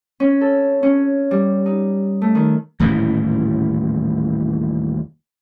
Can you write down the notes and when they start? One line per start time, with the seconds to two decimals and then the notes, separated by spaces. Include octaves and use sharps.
0.20 C#4
0.41 A4
0.83 C#4
1.31 G3
1.66 D#4
2.22 A3
2.35 D#3
2.80 D#1 A2 C#3 E3